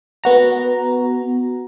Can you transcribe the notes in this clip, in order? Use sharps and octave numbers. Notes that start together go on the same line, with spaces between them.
B3 F#4 A#5